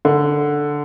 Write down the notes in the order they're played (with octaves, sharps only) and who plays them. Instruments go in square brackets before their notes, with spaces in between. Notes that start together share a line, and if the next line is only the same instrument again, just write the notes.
[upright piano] D3